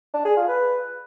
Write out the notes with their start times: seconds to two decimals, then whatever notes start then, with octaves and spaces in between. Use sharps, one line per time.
0.14 D4
0.25 G#4
0.37 F4
0.48 B4